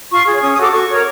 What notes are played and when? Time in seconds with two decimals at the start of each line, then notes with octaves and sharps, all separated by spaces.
0.11 F4 C#6
0.27 G#4 C#5
0.42 C#4 D#6
0.53 D#6
0.58 F#4 A4 D6
0.73 F#4 C#6
0.89 A#4 C#5